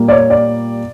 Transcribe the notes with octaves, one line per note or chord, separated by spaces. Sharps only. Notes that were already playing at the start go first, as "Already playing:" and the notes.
Already playing: A#2 G3 A#3
D5
C#5
D5